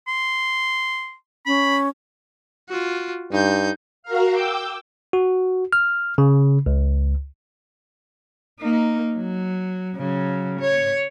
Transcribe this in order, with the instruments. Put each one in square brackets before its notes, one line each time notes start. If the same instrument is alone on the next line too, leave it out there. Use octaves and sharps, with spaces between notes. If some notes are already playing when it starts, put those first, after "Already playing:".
[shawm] C6
[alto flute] C#4 [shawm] B5
[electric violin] F4 F#4
[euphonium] G2 [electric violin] D#4 G6
[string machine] F#4 A#4 F5
G5 D6 E6 G6
[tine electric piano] F#4
F6
C#3
C#2
[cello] A#3 D#4
F#3
C#3 F#3
C#5